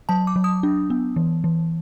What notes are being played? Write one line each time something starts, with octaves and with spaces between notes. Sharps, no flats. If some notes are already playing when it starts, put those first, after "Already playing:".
F#3 A5
D6
F#3
D#6
D4
B3
E3
E3